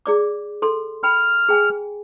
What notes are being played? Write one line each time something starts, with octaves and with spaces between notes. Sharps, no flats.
G#4 D5 D6
A4 C6
G5 B5 F6
G#4 G5 G#5